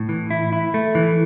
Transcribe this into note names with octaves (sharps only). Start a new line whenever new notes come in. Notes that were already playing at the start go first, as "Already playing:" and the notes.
Already playing: A2
E3
E4
E4
A3
E3